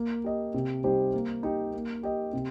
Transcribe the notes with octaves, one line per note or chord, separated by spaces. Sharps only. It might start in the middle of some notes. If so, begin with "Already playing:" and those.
Already playing: A#3
G4 D#5
C3
G3 D#4 G4 C5
A#3
D#4 G4
A#3
G4 D#5
C3